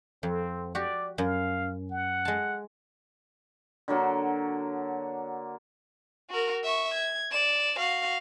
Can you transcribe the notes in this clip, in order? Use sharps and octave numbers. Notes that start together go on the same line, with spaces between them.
F2 C4
F#4 G4 D5
F#2 F5
F#5
G#3 A5
D3 F#3 A#3 F#4
F#4 A#4
E5 C#6
G#6
D5 E7
F#4 F5